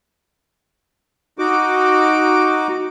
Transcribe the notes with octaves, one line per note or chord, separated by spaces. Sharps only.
D#4 F#4 D6